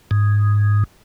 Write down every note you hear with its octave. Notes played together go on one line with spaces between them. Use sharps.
G#2